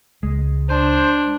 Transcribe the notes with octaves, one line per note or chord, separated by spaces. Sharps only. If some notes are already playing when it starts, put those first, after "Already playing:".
C#2 G#3
D4 C5